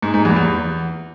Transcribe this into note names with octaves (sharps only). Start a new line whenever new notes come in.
G#2
G#2
E2
E2